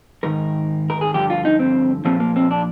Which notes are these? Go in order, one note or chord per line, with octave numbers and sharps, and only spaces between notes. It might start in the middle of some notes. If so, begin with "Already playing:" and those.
G#2 D#3 A#4
A#4
G#4
G2 D3 F3 G4
F4
D#4
C4
A#2 F3 C4
A#3
C4
D4